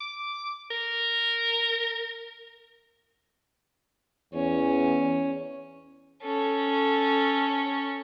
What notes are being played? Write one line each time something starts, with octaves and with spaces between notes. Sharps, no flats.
D6
A#4
E2 C#4
C#4 A4